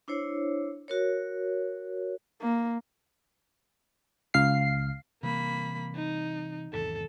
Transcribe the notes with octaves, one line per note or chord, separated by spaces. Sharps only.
D4 E4 C5 C#5
F#4 A#4 C#5
A#3
C#2 F5 C7
C3 E3 G3 A#3 B5
D#4
G#1 E2 C3 A4